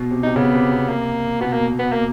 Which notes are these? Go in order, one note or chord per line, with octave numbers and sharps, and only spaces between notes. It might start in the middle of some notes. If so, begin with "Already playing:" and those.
Already playing: B2
C3
C3 D#4
C#3 B3
C3
C3
A#3
B2 B3
A#3
B3
A#3